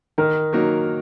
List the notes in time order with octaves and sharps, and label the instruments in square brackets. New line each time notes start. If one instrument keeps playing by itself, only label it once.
[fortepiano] D#3 [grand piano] A#4
[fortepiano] F#3 A#3 D#4